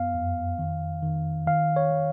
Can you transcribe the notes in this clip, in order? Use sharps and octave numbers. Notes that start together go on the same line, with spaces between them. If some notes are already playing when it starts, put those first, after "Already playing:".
Already playing: F#2 B3 F5
F2
D#3
D#3
D#3 F5
C#5
D#3